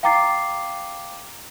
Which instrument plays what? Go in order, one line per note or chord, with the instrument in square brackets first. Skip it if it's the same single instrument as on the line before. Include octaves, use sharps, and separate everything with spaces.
[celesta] F5 G5 A#5 D6 A6 C7